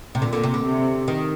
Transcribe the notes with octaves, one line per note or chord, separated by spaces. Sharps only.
C3
A#2 D3
D3
C3
D3
C3
D#3